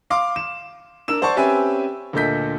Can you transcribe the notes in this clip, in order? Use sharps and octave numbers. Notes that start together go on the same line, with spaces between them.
F5 C6 D6
E7
D4 A#4 E6 E7
C5 D5 F#5 A5 C#6
C4 C#4 G4 B4 E5 G#5
D2 A#2 A4 D#5 G6 B6